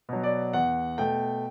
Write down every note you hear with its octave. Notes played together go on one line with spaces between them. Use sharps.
B2 F#3
D5
E2 F#5
B2 A3 G5